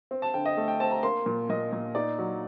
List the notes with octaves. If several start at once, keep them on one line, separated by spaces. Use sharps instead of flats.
C4
A5
D3 G5
D#5
A3
G5
C4 A5
A#5
A#3 C6
A#2
A#2 D#5
A#2
D#4 D5
F#3